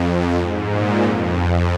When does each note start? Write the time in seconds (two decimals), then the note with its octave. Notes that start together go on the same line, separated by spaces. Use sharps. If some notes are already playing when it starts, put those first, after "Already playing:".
Already playing: F2
0.38 G#2
0.70 A#2
1.02 F2